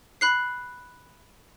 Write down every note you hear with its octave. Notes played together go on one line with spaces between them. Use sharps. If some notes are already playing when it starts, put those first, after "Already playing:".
B5 F#6 C7